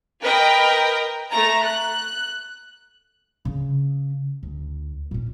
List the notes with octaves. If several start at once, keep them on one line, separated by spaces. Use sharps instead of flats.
A#4 B4 D#5 G5
A3 A#5
F#6
C#3
D2
A#2 C#4